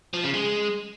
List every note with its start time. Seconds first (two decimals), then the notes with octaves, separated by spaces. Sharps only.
0.14 F3
0.24 C#3
0.34 G#3